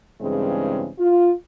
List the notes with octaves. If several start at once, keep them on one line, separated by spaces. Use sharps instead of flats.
G2 C#3 E3 G#3 C4
F4